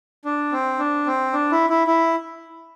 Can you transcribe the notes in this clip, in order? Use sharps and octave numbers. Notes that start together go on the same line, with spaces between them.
D4
C4
D4
C4
D4
E4
E4
E4